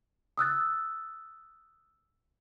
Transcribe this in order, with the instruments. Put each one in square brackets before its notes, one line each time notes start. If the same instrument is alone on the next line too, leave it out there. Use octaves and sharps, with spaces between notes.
[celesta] D#6 E6 F#6 A6